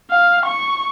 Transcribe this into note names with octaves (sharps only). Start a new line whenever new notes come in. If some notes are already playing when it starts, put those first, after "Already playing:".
F5
C#6